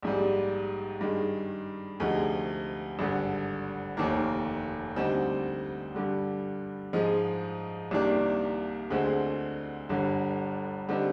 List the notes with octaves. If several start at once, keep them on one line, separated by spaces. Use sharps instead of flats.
A#1 G#2 G3
G2 D#3 G#3
D2 C3 F3 G#3 D#4
G#1 G2 D3
F1 D#2 D#3 A#3
D2 D3 G3 C4 D#4
G2 D3 G3
G#2 F3 G#3 D#4
C2 C3 D#3 A#3 D4
D2 D3 G#3 C4
G1 G2 D3
D3 G3 C4 D#4